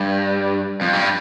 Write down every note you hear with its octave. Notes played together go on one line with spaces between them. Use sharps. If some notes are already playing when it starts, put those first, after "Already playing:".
Already playing: G2
F2
G2